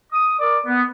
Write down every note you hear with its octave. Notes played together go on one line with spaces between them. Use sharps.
D#6
A#4 D5 D6
B3